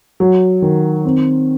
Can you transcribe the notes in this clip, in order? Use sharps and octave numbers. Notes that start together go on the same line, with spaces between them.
F#3
D#3
C4